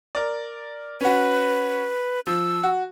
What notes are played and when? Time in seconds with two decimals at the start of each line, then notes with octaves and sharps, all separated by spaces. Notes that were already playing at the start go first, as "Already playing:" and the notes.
0.15 A#4 D5
1.01 C#4 F#4 B4
2.27 F3 E6
2.63 F#4